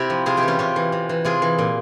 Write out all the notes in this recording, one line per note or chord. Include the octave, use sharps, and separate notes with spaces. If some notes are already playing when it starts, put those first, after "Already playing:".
Already playing: C3 E4 G4
F3
C3 F4 G#4
E4 G4
E3
C#4 F4
C3 C#4 F4
E3
C3
E3
C3 F4 G#4
E3
A#2